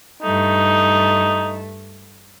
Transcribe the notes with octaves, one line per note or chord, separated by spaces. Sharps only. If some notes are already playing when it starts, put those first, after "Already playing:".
G2 A3 D#4